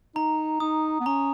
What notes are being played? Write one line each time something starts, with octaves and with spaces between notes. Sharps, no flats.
D#4 A#5
D#4 D#6
B3
C#4 A#5